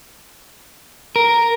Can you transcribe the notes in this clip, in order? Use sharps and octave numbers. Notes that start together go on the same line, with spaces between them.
A#4